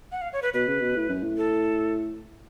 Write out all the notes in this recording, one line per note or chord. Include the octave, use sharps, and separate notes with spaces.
F#5
F5
C#5
B4
B2 B4
C#3
B2
A2
F#2
A2
A4